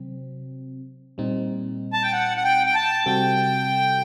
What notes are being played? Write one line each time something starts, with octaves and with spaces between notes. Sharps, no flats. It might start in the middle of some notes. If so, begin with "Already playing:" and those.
Already playing: C3 F#3 C4
A#2 G3 C4 D#4
A5
G5
F#5
F#5
G5
G5
A5
C3 G3 C4 F#4 A4 G5